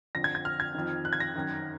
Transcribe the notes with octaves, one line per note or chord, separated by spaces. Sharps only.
F2 D3 A#6
G#6
G#6
F6
G#6
F2 D#3
F#6
G#6
A#6
F#2 D#3